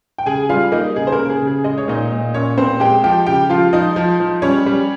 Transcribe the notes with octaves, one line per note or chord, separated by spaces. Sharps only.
G5
C#3 G#4 G#5
G3 F4 F5
A#3 D#4 D#5
C#3 G#4
C5
A#3 A#4
C#3
G#4
C#3
G#4
G#3 D#5
C#5
A#2 D#4 D#5
A#2
A#2 C#4 C#5
A#2 C4 C5
G#3 G4 G5
F3 G4 G5
C#3 G4 G5
F3 F4 F5
F3 D#4 D#5
F3
F3
G3 C#4 C#5
G3